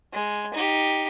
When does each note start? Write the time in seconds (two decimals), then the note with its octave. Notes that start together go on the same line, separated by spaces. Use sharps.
0.14 G#3
0.54 D#4 G4